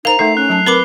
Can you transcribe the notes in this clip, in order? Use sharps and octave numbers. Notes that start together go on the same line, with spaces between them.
D#4 A#4 C5 F5 A#5 F7
A3 D#4 A4 E5 C7
C#4 F#6
F#3 A5
C4 A#4 B4 B5 D6 G7